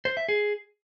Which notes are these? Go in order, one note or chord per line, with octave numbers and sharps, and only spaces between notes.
C5
E5
G#4